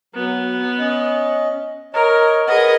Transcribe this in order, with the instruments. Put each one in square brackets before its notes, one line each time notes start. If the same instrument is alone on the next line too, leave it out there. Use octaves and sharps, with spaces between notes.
[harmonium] F#3 [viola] B3
[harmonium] C#4 D#5
[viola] A#4 [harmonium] C#5 D#5
[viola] G#4 D#5 [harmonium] A#4 B4 F#5